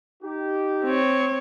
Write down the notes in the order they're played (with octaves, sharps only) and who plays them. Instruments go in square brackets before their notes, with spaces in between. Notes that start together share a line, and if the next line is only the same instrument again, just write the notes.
[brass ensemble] D#4 G4
[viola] C4 C#5